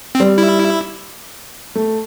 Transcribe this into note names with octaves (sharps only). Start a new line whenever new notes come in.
C4
G3
E4
A3